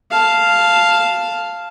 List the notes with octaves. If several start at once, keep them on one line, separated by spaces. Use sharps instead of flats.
F5 A5